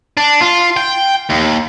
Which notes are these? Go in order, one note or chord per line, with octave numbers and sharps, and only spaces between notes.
D4
F4
G5
D#2